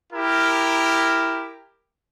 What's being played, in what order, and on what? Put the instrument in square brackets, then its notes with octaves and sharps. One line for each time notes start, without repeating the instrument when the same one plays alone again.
[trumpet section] E4 G4 A#4